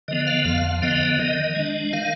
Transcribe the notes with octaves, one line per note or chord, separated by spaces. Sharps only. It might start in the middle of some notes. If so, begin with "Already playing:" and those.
D3 F3 B3 D#5
F5
F2 F5
D3 F3 B3 D#5
D#3 D#5
G#3 D4
D#3 F5